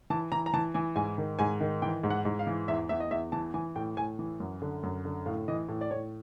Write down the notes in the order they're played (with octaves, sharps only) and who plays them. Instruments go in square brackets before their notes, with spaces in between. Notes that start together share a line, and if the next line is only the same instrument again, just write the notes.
[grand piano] E3 A5
E3 A#5
A#5
E3 A5
E3 G#5
G#2 G#5
D#3
G#2 G#5
D#3
E3 G5
G#2
F#5
G#2
F5
E3
E2 E5
E2 E5
D#5
E2 E5
E3 A5
E3 G#5
A2 G5
A2 G#5
E3
F#2
D3
F#2
D3
A2 F5
E3 D#5
A2
D5
A2 C#5